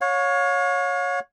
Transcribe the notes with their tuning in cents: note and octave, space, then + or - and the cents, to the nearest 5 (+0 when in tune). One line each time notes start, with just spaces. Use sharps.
C#5 +0 F5 +40